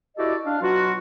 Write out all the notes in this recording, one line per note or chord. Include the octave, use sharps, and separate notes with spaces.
E4 F#4 G4 A4 D5 D#5
D4 F5
B2 F#3 F4 F#4